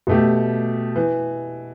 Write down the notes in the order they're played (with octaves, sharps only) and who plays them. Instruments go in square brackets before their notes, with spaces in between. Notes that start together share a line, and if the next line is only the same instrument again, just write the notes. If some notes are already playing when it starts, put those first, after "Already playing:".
[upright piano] B2 A3 G4
E3